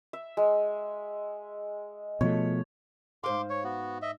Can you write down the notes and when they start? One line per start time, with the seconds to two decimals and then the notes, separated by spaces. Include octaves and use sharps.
0.13 E5
0.37 G#3
2.21 B2 F3 A3 C#5
3.24 G#2 C5 F5 C6 D6
3.50 C#5
3.64 B3 F#4
4.02 D#5 E5